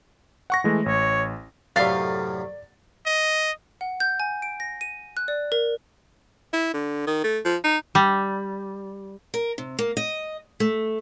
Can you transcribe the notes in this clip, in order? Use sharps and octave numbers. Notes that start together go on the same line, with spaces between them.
F#5 C#6 A#6
E3 G#3 A3
A1 C#5
F#2 A2 C3 A3 D5 F5 A6
D#5
F#5
G6
G#5
D7
A#6
D#7
F#6
D5
A#4
E4
D3
D#3
A3
F3
D#4
G3
A#4
C3
A#3
D#5
A3